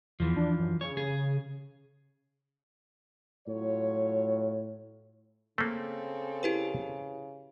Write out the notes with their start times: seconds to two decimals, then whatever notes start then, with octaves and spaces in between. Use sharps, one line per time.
0.20 E2 E3 F3
0.36 D4
0.59 F#2
0.81 C#3 C#5
0.97 G#4
3.48 A2 F#3 F4 C#5
5.58 C#3 A3 A#3 C4 A4
6.43 E4 G4 B4